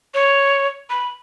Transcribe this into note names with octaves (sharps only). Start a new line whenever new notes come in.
C#5
B5